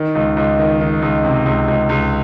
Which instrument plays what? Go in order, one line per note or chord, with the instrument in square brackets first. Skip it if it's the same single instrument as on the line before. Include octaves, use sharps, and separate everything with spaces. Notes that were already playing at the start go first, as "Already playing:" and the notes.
Already playing: [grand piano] D#3
C#2
C#2
D#3
D#3
C#2
C3
C#2
C#2
C#2